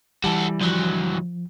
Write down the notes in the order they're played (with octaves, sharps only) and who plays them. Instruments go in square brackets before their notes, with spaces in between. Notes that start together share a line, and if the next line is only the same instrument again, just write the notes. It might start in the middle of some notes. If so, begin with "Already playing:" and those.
[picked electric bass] E3 G3 [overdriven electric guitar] F#4 A4
[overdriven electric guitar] D2 F#3 [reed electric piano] F3